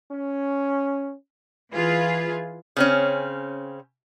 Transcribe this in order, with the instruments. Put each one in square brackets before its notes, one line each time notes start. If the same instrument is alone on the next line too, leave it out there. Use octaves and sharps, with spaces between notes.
[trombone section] C#4
[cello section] E3 F4 G#4 B4
[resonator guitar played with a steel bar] C#3 C4 C#4